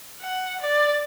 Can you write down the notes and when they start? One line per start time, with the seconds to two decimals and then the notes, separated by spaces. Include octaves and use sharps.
0.21 F#5
0.61 D5